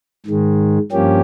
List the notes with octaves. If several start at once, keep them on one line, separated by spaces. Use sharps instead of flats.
G#2 D#3 G#3
G2 F3 A#3 C#4 G4